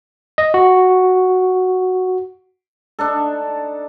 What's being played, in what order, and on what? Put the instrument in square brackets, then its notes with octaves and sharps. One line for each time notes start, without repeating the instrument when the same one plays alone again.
[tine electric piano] D#5
F#4
[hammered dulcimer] D4 D#4 A4